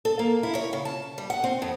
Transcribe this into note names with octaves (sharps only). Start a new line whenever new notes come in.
A4
A#3
E4
C#5
C#3
A5
G3
F#5
C4
F2